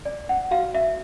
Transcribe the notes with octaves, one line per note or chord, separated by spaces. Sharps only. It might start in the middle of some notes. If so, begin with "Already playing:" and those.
D5
F#5
F#4 F5
E5